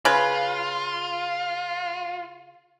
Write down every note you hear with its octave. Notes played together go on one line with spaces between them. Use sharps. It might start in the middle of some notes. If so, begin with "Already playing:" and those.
C#3 F4 B4